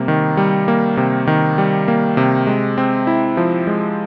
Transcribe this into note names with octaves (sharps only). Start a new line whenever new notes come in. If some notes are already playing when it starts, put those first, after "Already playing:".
Already playing: C3 G3 A#3
D#3
G3
A#3
C3
D#3
G3
A#3
C3
G#3
C4
E4
F3
G#3